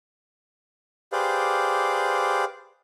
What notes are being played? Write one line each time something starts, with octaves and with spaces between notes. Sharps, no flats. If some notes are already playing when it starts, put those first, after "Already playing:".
G4 G#4 B4 C5 D5 F5